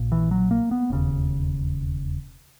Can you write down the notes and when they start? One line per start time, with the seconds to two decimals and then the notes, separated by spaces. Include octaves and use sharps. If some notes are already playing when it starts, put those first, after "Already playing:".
Already playing: A#1 A#2
0.12 E3
0.31 F#3
0.51 A#3
0.71 B3
0.90 E1 D#2 C#3